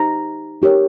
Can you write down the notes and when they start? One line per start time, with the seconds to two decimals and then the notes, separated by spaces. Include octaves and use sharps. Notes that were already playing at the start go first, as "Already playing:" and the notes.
Already playing: D#4 G4 C5 A#5
0.62 D#4 G4 A#4 C#5